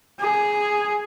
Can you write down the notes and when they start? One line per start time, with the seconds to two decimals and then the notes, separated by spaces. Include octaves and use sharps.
0.20 G#4